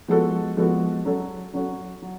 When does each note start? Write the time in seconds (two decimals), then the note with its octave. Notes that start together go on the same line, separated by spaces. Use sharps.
0.08 F3 G#3 B3 F#4 A4
0.57 F3 G#3 B3 F#4 A4
1.05 F#3 C#4 F#4 A4
1.53 F#3 C#4 F#4 A4
2.02 F#3